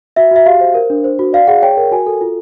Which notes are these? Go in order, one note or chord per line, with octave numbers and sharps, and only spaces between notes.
F#4 E5
F#4 E5
G4 F5
C5
A#4
D4
C5
F#4
D5 F5
G#4 F#5
C#5 G5
A#4
F#4 G#5
A4
F4